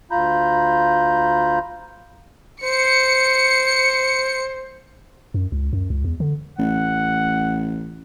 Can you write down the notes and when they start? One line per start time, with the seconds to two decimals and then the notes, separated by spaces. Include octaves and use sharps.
0.11 D2 F4 A#5 B5 G6
2.63 C5 C#7
5.34 F#2
5.52 C#2
5.73 F#2
5.90 C#2
6.04 E2
6.20 D3
6.59 A1 F#5